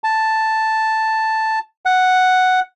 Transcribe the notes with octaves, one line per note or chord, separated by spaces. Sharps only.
A5
F#5